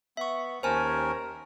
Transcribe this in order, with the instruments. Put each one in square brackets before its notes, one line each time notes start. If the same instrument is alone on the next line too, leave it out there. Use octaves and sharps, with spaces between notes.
[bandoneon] B3 [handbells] E5 C#6
[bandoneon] D#2 A#4 [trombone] C#4 [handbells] C5 G#5 A5